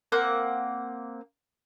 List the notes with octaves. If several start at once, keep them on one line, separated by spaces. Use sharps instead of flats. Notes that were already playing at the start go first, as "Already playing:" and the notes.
A#3 C4 F#5